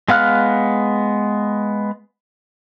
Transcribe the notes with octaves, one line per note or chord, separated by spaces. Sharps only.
G#3 B3 F5 F6 F#6